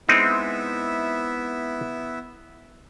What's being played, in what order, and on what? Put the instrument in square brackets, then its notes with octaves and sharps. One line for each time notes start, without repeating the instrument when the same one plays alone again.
[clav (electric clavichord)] G#3 C4 D#4 [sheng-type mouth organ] B3 E4 E5